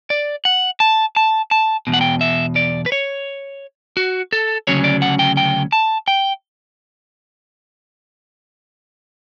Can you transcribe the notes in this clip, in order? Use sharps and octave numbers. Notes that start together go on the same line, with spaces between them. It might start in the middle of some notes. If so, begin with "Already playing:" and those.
D5
F#5
A5
A5
A5
E2 B2
F#5
G5
E5
D5
B4
C#5
F#4
A4
D2 C#3 F#3 C#4 C#5
D5
F#5
G5
G5
A5
G5